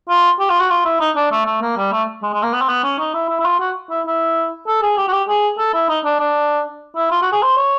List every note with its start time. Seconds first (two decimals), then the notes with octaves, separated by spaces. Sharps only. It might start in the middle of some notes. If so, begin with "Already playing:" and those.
0.09 F4
0.40 G4
0.50 F4
0.60 F#4
0.70 F4
0.85 E4
1.00 D#4
1.16 D4
1.31 A3
1.46 A3
1.62 A#3
1.77 G3
1.92 A3
2.23 G#3
2.33 G#3
2.43 A#3
2.53 B3
2.61 C4
2.69 B3
2.84 C#4
2.99 D#4
3.14 E4
3.29 E4
3.40 E4
3.45 F4
3.60 F#4
3.90 E4
4.06 E4
4.67 A4
4.82 G#4
4.97 G4
5.08 F#4
5.13 G4
5.28 G#4
5.58 A4
5.74 E4
5.89 D#4
6.04 D4
6.20 D4
6.96 E4
7.11 F4
7.22 F#4
7.32 G#4
7.42 C5
7.57 C#5